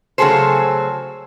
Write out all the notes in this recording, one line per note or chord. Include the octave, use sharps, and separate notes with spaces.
C#3 F#3 A3 G#4 A4 C5